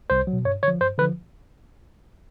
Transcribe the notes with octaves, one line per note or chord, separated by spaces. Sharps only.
C2 C5
F#3
B2
G2 C#5
D3 F3 C#5
G2 C5
D3 F3 B4